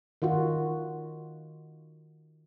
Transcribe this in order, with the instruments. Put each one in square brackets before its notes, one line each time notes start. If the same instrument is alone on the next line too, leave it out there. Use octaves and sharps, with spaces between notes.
[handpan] D#3 F4 F#4